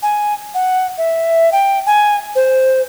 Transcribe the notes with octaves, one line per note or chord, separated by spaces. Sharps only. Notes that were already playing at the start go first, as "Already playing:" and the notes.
G#5
F#5
E5
G5
G#5
C5